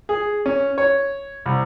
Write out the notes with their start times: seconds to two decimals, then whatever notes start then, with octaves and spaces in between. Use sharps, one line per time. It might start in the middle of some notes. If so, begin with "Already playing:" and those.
0.09 G#4
0.46 C#4
0.78 C#5
1.46 C2